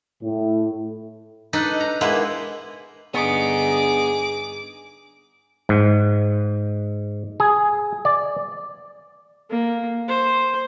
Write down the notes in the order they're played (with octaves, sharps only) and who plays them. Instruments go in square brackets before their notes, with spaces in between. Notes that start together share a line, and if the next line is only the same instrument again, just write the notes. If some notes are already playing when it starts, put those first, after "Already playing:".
[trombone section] A2
[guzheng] D4 D#4 A4 B4
A#5
G#3 A#3 B3 E4 B4 C5
[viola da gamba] G2 D3 D#4 [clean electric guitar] B3 [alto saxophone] G#4 [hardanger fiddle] D6
[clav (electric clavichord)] G#2
G#4
D5
[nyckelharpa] A#3
C5